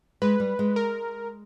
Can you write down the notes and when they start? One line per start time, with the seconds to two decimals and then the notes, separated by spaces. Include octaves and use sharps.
0.22 G#3 B4
0.40 G3
0.59 G#3
0.76 A#4